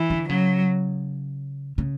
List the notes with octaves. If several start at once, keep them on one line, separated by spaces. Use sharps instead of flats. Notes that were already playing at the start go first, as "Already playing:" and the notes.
Already playing: E3
D3
C#3 F#3
C#3